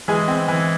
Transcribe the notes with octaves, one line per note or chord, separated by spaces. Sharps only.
E3 G#3 G#4
C4
E3